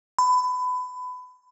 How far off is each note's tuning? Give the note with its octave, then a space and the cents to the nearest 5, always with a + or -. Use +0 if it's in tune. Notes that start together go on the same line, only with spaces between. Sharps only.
B5 +25